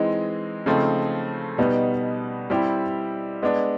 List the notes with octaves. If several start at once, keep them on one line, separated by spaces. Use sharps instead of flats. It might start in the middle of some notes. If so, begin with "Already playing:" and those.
Already playing: E3 G#3 C4 D#4
C#3 F3 A3 C4 D#4
B2 G3 B3 D#4
G3 C4 E4 G4
G#3 B3 D4